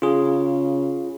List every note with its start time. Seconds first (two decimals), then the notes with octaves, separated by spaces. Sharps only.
0.02 C#3 F4 G#4